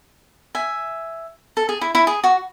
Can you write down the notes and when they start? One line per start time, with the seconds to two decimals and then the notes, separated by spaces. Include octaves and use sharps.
0.55 E5 G#5
1.57 A4
1.69 G#4
1.81 E4
1.95 E4
2.07 G#4
2.24 F#4